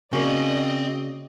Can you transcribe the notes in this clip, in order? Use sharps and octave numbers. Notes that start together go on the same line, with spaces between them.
C#3 A#3 C4 F#4 D5 D#5 G#5